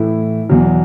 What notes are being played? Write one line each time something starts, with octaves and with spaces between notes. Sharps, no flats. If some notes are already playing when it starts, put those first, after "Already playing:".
Already playing: A2 E3 E4
E2 B2 F#3